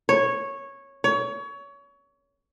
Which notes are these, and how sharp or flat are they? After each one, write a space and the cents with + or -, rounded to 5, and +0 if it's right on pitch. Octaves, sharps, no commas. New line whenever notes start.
C#5 -10
C#5 +25